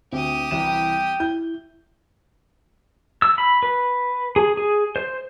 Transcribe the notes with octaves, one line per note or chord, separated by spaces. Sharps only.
D2 C4 G4 D#6
C2 E3 G5 E7
E4 G6
E6
B5
B4
G#4
G#4
C5